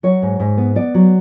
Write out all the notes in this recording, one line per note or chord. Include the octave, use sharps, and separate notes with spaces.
F#3 C#5
G#2
G#2
B3
B3 D5
F#3